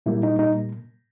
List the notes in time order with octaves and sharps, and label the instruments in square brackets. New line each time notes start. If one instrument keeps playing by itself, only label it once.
[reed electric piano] A#2 G3 A#3 E4
D#4
D#4